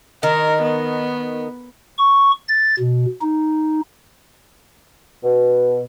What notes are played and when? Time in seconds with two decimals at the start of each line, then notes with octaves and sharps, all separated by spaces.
0.23 D#3 A#4
0.62 B3
1.98 C#6
2.48 A6
2.79 B2
3.22 D#4
5.24 B2